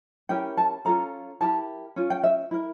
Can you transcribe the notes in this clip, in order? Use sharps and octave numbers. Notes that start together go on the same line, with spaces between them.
C#4 E4 G4 A#4 G5
A5
C#4 F4 A4 A#5
E4 G4 A#4 A5
C#4 F4
G5
E5
E4 A#4